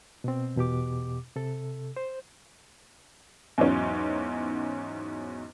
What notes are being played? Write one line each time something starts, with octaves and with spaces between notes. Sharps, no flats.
B2 C4
E2 B2 G4 D6
C3 A4
C5
E2 G#2 F#3 C#4